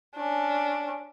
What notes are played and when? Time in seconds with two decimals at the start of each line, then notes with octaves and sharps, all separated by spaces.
0.15 C#4 D4